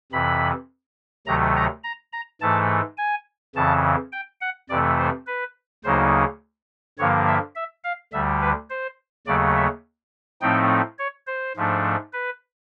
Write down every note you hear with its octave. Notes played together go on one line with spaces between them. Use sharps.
F2 C3 E3 B5
D2 C3 D#3 F#3 A3 A#5
A#5
A#5
A#5
G#2 E3 A3 A5
G#5
F2 C#3 E3 A5
G5
F#5
F2 C3 E3 A3 D5
C5
B4
D2 C#3 F#3 A#3 D#4 C5
G2 D3 F3 A#3 C#5
E5
E5
F5
D2 D3 G3 E5
B4
C5
D#2 C#3 F#3 A3 D5
E5
A2 F3 A3 C4 D#4 G5
C#5
C5
G#2 F3 A3 D4
B4